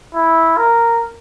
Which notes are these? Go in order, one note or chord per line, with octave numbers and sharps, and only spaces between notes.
E4
A#4